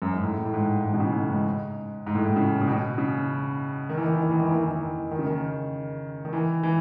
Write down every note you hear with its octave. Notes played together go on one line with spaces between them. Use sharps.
F#2
G#2
A2
A2
G#2
G#2
B2
C#3
A2
G#2
G#2
A2
G#2
C#3
C#3
B2
C#3
D#3
E3
D#3
E3
D#3
E3
D#3
E3
D#3
E3
D#3
D#3
C#3
D#3
D#3
E3
E3